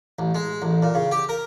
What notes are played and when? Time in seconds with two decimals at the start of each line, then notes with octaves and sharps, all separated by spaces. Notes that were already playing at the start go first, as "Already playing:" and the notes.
0.19 A1
0.35 G#3
0.62 A1
0.83 A#2
0.94 C#3
1.11 G4
1.29 A#4